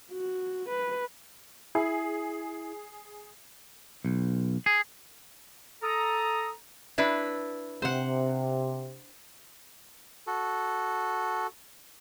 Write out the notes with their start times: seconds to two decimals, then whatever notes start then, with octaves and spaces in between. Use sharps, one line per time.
0.11 F#4
0.69 B4
1.75 E4 G#4
4.05 B1
4.66 G#4
5.83 A4 A#5 D#6
6.98 D4 E4 B4
7.82 C3 C5 F#5
10.27 F#4 A4